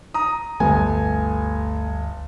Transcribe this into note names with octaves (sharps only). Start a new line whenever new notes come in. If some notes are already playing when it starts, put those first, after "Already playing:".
A#5 D#6
G1 D2 G3 A3 G#5